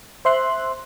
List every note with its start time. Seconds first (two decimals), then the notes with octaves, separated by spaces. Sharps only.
0.25 C5 E5 C6 F#6